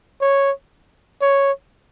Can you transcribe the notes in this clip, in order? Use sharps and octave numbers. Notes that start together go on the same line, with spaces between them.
C#5
C#5